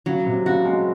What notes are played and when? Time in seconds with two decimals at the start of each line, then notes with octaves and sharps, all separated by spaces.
0.06 C#3 F#3
0.26 C3
0.46 C#3 F#4
0.65 G#3